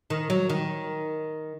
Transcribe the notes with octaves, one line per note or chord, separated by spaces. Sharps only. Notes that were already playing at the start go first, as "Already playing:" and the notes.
D#3
F#3
D#3